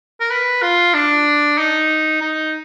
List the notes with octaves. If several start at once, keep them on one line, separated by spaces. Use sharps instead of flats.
A#4
B4
F4
D4
D#4
D#4